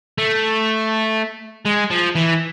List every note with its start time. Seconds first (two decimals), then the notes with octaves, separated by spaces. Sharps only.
0.18 A3
1.65 G#3
1.90 F3
2.15 E3